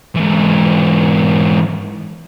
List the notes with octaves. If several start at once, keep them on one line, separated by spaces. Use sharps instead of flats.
G#2 E3